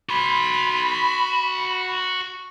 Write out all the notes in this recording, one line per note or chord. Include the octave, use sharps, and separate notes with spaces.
F#4 B5 C6